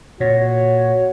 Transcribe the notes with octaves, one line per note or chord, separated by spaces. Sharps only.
A#2 F#4 C#5